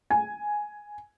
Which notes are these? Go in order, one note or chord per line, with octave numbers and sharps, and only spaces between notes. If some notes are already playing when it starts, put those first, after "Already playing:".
G#5